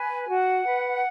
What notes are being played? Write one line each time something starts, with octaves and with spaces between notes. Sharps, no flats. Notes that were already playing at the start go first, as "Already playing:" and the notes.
Already playing: B4 G#5
F#4 F#5
B4